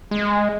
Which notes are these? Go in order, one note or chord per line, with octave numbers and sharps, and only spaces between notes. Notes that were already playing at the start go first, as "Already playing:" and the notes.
G#3